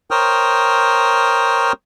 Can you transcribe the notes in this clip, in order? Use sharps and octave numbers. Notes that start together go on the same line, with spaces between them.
A#4 C5 C#5 G5 D#6 F6